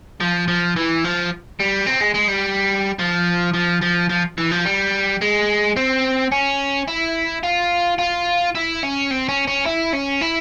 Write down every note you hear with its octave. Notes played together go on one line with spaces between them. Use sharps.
F3
F3
E3
F3
G3
C4
G#3
G#3
G3
F3
F3
F3
F3
E3
F3
G3
G#3
C4
C#4
E4
F4
F4
E4
C#4
C4
C#4
C#4
E4
C#4
E4